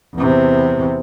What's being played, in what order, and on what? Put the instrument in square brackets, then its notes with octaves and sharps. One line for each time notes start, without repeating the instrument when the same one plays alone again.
[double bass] E2 C3